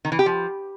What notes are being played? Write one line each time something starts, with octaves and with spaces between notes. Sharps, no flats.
D#3
E3
G4
F3